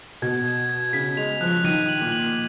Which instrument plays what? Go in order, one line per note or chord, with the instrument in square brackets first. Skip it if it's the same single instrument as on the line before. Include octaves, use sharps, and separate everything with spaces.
[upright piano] B2 [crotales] G#6
[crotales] G#6
G#6
[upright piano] C#3 [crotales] B6
[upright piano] G#3 [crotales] F7
[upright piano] F3 [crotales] F#6
[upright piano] D#3 [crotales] D#7
[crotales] F#7
[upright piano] A#2
[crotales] F#7